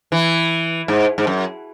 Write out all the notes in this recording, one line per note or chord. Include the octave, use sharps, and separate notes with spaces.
E3
G#2
G#2
F#2